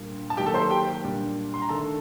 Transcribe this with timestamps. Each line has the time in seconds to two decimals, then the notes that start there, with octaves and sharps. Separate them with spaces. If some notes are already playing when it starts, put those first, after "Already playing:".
Already playing: A#2 G3 D4
0.30 A5
0.37 D#3 F#3 A#3 G4 G5
0.46 A4 A5
0.54 C5 C6
0.70 G4 G5
1.04 A#2 G3 D4
1.54 C6
1.62 A#5
1.69 D#3 A3 D4 A4 A5